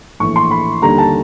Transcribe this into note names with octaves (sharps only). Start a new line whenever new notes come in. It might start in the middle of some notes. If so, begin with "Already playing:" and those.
A#1 A2 E3 C#6
C6
B5
D#2 D3 G3 A#5
A5